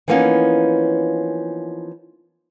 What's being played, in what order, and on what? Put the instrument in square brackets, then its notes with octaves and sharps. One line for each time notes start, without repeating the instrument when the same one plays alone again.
[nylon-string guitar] E3 F3 A#3 B3 C#4 D#4